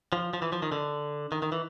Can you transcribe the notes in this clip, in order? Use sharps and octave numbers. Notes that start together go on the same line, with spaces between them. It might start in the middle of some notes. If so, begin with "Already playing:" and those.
F3
F3
E3
F3
D#3
D3
D#3
D#3
E3